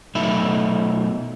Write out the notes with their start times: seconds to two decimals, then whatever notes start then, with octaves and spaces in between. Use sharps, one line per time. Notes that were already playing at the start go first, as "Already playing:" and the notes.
0.15 B2 F#3 A3 D#4 E5 B5